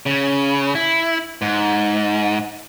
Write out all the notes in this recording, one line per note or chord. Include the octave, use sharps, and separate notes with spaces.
C#3
E4
G#2